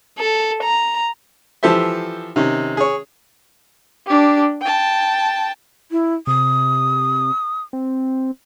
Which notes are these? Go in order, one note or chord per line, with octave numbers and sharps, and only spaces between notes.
A4
A#5
E3 F3 G4 A4 C5 E5
C3 D#3 C#4
G#4 C#5
D4 G4
G5 A5
E4
C3 D#6
C4